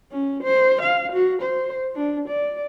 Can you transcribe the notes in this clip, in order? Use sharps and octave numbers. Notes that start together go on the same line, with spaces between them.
C#4
C5
F5
F#4
C5
D4
D5